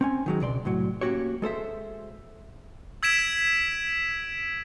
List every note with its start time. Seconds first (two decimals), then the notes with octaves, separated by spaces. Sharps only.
0.01 C4 C#4 G#5
0.26 D#3 F#3 G#3
0.40 C#2 B2 D5 C6
0.65 C2 A2 F#3
1.01 A#3 C#4 F#4 G4 C#5
1.42 G#3 A4 C5 E5
3.03 E6 G#6 B6 D7 E7